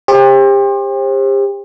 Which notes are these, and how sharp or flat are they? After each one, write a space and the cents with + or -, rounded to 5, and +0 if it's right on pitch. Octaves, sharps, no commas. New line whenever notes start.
G4 +35 C5 +35